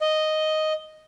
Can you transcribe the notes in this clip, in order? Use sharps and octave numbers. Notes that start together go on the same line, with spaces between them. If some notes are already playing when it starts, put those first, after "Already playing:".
D#5